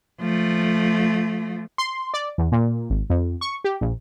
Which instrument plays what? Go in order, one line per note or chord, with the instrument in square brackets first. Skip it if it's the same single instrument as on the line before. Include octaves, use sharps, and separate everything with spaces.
[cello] F3 A3
[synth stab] C6
D5
E2
A#2
G#1
F2
C#6
G4
A#1